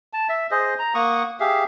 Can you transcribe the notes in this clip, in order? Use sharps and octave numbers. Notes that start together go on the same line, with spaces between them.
A5
E5
G#4 C5 D#5
A#5
A#3 F#5 C#6 D#6
G4 G#4 E5 F5